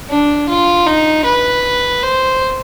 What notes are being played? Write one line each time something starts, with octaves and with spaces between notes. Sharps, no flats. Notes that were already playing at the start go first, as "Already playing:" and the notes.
D4
F4
D#4
B4
C5